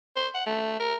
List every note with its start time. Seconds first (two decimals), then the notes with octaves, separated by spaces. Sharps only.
0.16 C5
0.34 F#5
0.46 A3
0.80 A#4